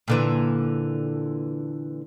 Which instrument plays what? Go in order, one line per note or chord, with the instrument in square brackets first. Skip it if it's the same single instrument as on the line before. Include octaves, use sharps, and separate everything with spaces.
[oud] A#2 D3 E3